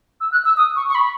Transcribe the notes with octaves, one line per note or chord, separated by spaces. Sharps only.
E6
F#6
E6
D#6
C#6
C#6
B5